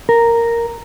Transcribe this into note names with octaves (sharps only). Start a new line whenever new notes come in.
A#4